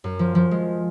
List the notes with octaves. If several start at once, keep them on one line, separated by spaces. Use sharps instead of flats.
F#2
F3
F3
G#3